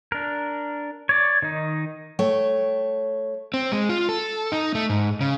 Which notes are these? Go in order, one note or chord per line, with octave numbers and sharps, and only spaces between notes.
D4 A#4
C#5 D5
D#3 D#4
A3 C#5 G5
C4
G#3
F4
A4
D#4
A3
G#2
C#3